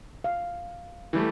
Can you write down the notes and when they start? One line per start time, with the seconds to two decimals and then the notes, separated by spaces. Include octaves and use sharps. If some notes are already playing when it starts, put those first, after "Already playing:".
0.24 F5
1.13 E3 G3 A3